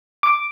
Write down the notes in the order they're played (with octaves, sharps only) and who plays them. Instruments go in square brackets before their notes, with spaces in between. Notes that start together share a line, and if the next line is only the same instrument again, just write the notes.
[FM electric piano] D6